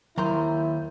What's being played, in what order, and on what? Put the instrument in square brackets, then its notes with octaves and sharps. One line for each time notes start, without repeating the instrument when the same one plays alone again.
[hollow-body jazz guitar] D#2 A#5 C6 [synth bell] F#3 A#4 G6 [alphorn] E4